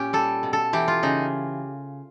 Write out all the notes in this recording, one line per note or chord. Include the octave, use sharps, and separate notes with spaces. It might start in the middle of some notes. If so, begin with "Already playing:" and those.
Already playing: A#2 C#4 G4
G3 A4
B2
A4
E3 G4
F4
C#3 D#4